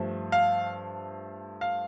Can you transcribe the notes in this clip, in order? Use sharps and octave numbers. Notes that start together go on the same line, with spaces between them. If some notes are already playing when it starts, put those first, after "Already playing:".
Already playing: G2 F3 A3
F5
F5